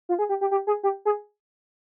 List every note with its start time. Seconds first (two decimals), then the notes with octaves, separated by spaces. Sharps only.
0.09 F4
0.19 G#4
0.29 G4
0.41 G4
0.51 G4
0.67 G#4
0.83 G4
1.05 G#4